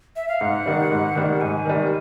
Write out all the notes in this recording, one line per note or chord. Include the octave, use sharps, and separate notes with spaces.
E5
F5
G#2 F#5
D#3 G3
G#2
D#3 G3
G#2 G#5
D#3 G3